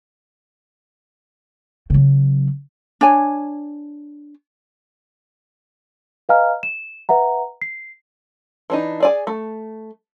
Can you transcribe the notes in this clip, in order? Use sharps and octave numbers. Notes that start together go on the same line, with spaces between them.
C#3 F#3
D4 C#5 G#5
B4 D#5 F5 G#5 A#5 F6
E7
B4 E5 F#5 A#5
C7
E3 D4 D#4
G#4 D5 G#5
A3